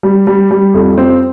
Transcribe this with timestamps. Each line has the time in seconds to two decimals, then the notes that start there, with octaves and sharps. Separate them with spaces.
0.03 G3
0.27 G3
0.51 G3
0.74 F2
0.98 C4